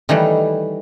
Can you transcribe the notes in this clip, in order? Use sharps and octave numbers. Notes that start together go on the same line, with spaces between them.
D#3 E3 G3 A3 B4